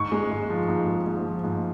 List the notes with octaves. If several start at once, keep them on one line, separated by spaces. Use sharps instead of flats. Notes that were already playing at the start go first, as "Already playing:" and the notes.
Already playing: G#2 C#6
G#3
G#2
F3
G#2
G#3
G#2
F3
G#2